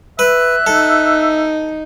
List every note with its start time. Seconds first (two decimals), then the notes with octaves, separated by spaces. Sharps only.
0.19 B4 E5 F#6
0.66 D#4 A4